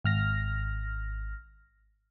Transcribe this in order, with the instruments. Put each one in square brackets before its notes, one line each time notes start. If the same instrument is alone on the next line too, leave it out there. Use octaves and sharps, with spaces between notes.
[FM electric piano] G#1 F6 A#6